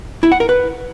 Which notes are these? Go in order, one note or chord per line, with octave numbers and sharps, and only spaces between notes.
E4
F#5
A#4
B4